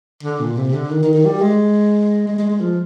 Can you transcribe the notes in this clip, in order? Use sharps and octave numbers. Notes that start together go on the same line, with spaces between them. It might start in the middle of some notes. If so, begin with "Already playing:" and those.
D3
A#2
C3
D3
D#3
D#3
D#3
G3
G#3
G#3
G#3
G#3
F3